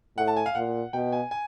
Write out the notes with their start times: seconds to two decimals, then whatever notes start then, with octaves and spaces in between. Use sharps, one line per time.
0.17 A2 F#5
0.28 A5
0.36 G#5
0.46 F5
0.55 A#2 F#5
0.93 B2 G5
1.12 G#5
1.31 G#5